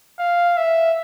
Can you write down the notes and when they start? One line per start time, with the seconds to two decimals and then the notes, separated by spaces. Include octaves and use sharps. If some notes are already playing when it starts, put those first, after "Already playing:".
0.19 F5
0.57 E5